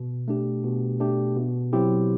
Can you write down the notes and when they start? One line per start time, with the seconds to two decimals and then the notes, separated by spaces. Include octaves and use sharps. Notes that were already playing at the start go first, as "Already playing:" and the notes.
Already playing: B2
0.28 A3 D4 G4
0.63 B2
1.00 A3 D4 G4
1.36 B2
1.73 F#3 C4 E4 G4